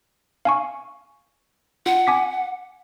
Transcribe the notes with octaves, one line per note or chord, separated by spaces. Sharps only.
F5 G#5 C#6
F4 F#5
G#5 D6 B6